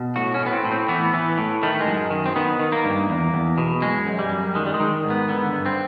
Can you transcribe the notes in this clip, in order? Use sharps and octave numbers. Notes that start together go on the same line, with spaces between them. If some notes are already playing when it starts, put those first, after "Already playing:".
Already playing: B2
A2 F#4
C#4
A2
B3
C4
A2
C4
E3 B3
E3
A2
D#3 A3
G#3
F#2
D#3
C4
D#3 B3
D#3
A#3
G2
E2
E2
B2
F#2 G#3
F#2
G3
F#2
D#3 G#3
G3
G#3
D#3
G#2
B3
D3 B3
G2
C4